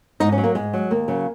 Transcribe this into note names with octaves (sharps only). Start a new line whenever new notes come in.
G#2 D#4
C#4
F#3
A#3
G#2 G#3
F#3
D#2 A#3
C#3 F#3